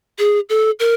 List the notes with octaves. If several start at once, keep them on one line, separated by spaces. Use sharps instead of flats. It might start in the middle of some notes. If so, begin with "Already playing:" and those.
G#4
A4
A#4